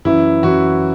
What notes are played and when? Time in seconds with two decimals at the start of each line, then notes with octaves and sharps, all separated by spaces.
0.05 F#2 E3 E4
0.43 F#2 E3 F#4